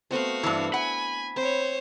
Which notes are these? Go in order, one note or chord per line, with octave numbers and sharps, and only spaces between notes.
A3 B3 C4 F#4 F5
G2 E3 D4
F#5 G#5 B5
C4 C5 C#5